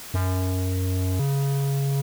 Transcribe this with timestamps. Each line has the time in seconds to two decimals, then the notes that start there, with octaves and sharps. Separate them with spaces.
0.14 F#2
1.19 C#3